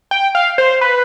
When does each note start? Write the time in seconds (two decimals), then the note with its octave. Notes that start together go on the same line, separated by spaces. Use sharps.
0.11 G5
0.35 F5
0.58 C5
0.81 B4